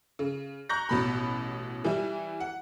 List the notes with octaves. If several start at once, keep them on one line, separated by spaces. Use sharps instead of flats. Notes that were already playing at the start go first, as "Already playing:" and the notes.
C#3
A#5 C#6 F#6 G6 A#6
A1 B2 B5
E3 G3 E4
F#5